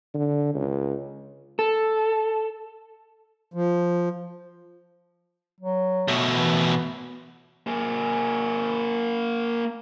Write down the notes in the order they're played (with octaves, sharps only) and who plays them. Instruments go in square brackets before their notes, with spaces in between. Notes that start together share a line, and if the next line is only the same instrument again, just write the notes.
[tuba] D3
C#2
[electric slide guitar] A4
[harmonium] F3
[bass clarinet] F#3
[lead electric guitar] B2 A3
[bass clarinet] E3
[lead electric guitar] A#3 G#4